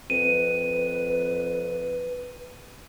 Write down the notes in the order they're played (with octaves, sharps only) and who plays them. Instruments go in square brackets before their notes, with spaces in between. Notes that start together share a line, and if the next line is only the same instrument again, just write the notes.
[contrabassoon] F2 [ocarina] B4 [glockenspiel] D#7